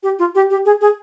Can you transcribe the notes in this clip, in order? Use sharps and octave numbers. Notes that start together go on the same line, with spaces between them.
G4
F4
G4
G4
G#4
G#4